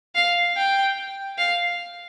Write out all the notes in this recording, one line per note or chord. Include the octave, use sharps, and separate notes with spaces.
F5
G5
F5